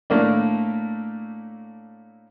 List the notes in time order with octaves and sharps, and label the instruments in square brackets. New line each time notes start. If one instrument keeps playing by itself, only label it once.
[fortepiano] A2 A3 A#3 D4